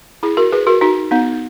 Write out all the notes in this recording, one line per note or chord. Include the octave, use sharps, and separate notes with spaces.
E4 G#4
F#4 A#4
G#4 B4
F#4 A#4
D#4 F#4
B3 D#4